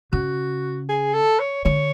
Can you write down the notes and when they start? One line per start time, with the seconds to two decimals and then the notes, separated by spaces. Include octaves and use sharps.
0.12 C#3 F#4
0.89 G#4
1.14 A4
1.39 C#5
1.65 D3 C#5